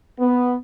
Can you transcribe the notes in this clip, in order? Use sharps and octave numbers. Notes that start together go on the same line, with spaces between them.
B3